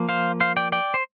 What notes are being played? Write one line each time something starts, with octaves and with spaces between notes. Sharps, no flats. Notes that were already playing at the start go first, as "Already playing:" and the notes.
Already playing: F3 A#3
C5 F5
C5 F5
D5 G5
D5 G5
C5